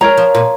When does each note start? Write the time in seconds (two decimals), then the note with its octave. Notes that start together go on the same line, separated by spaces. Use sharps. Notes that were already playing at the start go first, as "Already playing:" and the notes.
0.01 G#3 A#4 C#5 A#5
0.17 F3
0.35 A#2